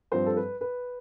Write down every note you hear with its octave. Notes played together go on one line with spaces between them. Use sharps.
G2 F3 C4 C5
A4
B4
B4